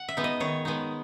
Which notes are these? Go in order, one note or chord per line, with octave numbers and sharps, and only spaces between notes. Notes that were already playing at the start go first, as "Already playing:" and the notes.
Already playing: F#5
E5
G#3 B3 D#4
D#5
D#3 C#5
G#3 B3 D#4